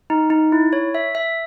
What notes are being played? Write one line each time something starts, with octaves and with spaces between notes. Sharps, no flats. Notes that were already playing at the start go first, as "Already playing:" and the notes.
D#4
D#4
E4
C#5
E5
E5